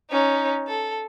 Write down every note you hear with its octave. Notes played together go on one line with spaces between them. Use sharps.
C#4 D#4
A4